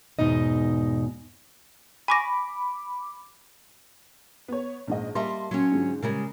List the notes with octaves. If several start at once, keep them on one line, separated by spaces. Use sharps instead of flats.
E2 G#2 B2 D#4 D#5
G#5 B5 C#6 D6 A#6
B3 C#5
A#1 G#2 D#5
G3 A#3 D#5 E5 A5 C6
F#3 C#4
G#2 D3 F3
C#3 G3 G#3 A#4